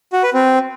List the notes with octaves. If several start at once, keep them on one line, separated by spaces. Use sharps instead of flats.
F#4
B4
C4